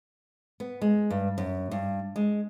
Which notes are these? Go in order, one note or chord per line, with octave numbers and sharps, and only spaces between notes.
B3
G#3
G2
F#2
G2
G#3